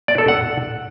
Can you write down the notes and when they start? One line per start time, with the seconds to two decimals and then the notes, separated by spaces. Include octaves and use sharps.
0.08 D5
0.18 A4
0.28 F#5